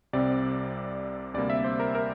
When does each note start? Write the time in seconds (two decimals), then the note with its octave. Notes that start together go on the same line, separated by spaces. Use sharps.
0.13 C2 C3 G3 C4 D5
1.34 D2 C3 G3 A#3 D5
1.50 E5
1.64 C5
1.80 A#4
1.95 A#4